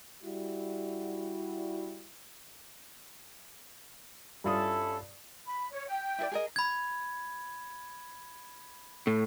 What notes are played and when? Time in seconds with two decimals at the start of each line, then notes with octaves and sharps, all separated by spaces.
0.23 G3 E4 F#4
4.44 G2 C#4 E4 F4 A4 D#6
5.46 B5
5.71 C#5
5.88 G5
6.19 E4 A#4 D5
6.32 G#4 A#4 D#5
6.56 B5 G#6
9.07 A2